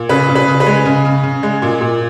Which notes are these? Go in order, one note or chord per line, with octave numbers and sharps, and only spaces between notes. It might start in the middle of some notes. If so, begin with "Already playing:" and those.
Already playing: A#2
C#3 B4
C#3
B4
C#3
B4
G#3
C#3
C#3
C#3
G#3
A#2
A#2